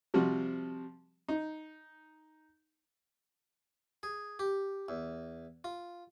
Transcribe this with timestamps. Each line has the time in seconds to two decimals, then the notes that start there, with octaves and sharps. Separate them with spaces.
0.14 C3 F3 G3 F#4
1.28 D#4
4.03 G#4
4.39 G4
4.89 E2
5.64 F4